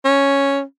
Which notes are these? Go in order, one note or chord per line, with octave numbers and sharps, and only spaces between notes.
C#4